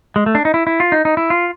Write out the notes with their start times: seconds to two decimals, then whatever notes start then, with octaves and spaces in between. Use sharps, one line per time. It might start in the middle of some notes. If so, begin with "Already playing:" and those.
0.16 G#3
0.26 A3
0.35 D4
0.45 D#4
0.54 E4
0.67 E4
0.80 F4
0.92 D#4
1.05 D#4
1.17 E4
1.30 F4